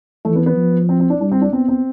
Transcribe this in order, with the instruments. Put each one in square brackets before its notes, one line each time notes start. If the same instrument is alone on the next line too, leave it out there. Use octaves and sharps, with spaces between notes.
[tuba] E3 [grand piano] A3
[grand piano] B3
B3
[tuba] F3
[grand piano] C4
C4
D4
[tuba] G3 [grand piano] D4
[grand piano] C4
D4
[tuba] B3 [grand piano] C4
[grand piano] C4